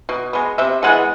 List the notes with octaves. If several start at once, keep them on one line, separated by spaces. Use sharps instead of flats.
B2
G#3 B3
C3 E5
E3 G#3 B3 F#5